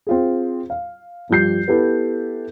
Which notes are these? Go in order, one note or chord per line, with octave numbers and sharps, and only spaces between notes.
C4 F4 G#4
F5
G2 F3 G4 G6 C7
B3 E4 G4 A4 B4